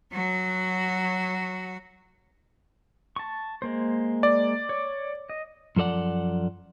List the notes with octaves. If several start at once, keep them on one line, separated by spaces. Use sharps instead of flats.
F#3 F#4
A5 C#6
G#3 A#3 C5
D5
C#5
D#5
F#2 F3 A4 D5 F#5